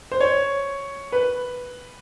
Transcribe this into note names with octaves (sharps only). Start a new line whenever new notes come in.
C5
C#5
B4